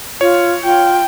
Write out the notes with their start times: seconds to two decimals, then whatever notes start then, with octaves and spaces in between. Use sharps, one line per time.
0.21 F4 C#5
0.63 F4 G5